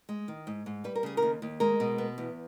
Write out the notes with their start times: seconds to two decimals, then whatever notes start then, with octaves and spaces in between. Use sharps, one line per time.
0.09 G#3
0.28 D#3
0.47 G#2
0.66 G#2
0.84 G3 B4
0.95 A#4
1.03 C#3 G#4
1.17 A#4
1.22 D#2
1.42 D#2
1.60 G#3 A#4
1.80 B2
1.98 B3
2.18 E2